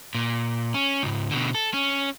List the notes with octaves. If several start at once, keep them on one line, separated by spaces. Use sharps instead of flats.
A#2
C#4
C#2 G#2
B2 D3
A4
C#4